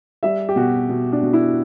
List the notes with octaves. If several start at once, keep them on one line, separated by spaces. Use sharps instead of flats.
G3 E5
G4
B2 F#4
B2
D4
B2
E4